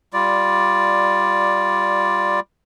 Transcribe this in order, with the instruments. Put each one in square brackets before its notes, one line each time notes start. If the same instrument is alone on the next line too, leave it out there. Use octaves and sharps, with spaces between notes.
[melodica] G3 F4 D5